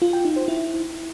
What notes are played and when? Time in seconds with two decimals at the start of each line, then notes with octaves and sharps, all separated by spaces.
0.02 F4
0.13 G5
0.25 D#4
0.36 C5
0.48 E4